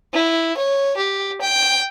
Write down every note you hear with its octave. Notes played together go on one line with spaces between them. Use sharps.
E4
C#5
G4
G5